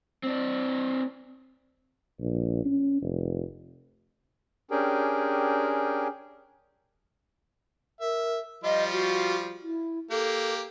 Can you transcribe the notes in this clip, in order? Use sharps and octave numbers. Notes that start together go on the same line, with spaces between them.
C4 D4
A#1
C#4
F1
C#4 D4 G4 G#4 A#4 G5
A#4 E5
F3 G3 F4 D#5
F#4
E4
A#3 G4 A4